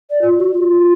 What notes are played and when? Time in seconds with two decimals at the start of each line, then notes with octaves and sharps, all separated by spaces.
0.10 D5
0.22 F4
0.38 F#4
0.53 F#4
0.58 F4